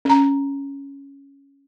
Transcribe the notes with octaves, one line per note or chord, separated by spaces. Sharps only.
C#4 A#5